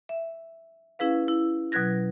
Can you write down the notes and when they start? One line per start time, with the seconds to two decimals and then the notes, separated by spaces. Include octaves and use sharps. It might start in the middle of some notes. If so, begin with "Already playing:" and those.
0.09 E5
0.99 C#4 E4 G#4 B4 F5
1.28 E4
1.72 B2 F#3 B4 F#6 G#6 A#6